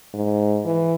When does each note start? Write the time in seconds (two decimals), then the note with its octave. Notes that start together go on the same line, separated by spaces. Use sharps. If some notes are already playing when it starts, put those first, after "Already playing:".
0.14 G#2
0.65 E3